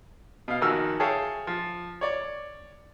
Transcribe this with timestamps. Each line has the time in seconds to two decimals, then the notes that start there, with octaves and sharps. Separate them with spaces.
0.48 B2 F5
0.61 A#1 D#3 F#4 G#5 E6 F6
1.00 G#4 C#5 E5 F5 G5 A5
1.47 F3
2.01 C#5 D5